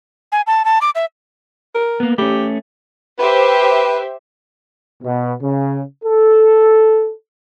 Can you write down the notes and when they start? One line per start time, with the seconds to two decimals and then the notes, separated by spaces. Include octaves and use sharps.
0.32 G#5
0.47 A5
0.65 A5
0.82 D6
0.95 E5
1.75 A#4
2.00 A#3 B3
2.18 A3 C#4 G4
3.19 G4 B4 C5 E5
5.03 B2
5.42 C#3
6.05 A4